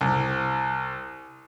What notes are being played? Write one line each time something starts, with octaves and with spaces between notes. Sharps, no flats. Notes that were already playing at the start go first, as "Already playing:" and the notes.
C2